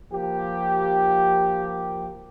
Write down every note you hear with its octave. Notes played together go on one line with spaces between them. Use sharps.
F3 A#3 G4